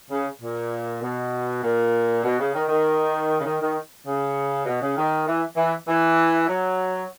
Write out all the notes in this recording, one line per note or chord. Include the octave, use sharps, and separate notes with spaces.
C#3
A#2
B2
A#2
B2
C#3
D#3
D#3
C#3
D#3
D#3
C#3
B2
C#3
D#3
E3
E3
E3
F#3